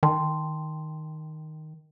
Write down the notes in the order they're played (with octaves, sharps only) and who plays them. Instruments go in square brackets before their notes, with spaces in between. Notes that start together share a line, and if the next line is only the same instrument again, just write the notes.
[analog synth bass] D#3 [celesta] G5 A5 C6